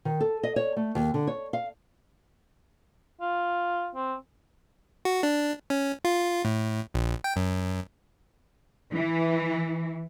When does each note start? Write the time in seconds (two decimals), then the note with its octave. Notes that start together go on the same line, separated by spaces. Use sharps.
0.05 D#3
0.20 A4
0.43 D#5
0.56 C#5
0.76 A3
0.95 D#2
1.14 D3
1.27 C#5
1.53 F5
3.21 F4
3.95 C4
5.05 F#4
5.23 D4
5.70 C#4
6.05 F4
6.45 A2
6.94 A#1
7.24 G5
7.36 F#2
8.93 E3